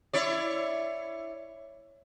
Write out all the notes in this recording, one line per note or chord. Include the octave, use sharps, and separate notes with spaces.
E4 C#5 D5